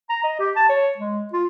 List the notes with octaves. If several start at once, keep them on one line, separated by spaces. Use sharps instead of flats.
A#5
D#5
G4
A5
C#5
G#3
F4